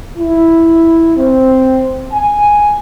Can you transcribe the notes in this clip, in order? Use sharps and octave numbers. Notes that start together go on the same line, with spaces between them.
E4
C4
G#5